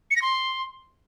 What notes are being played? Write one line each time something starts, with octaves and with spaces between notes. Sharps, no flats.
C#7
A#6
C6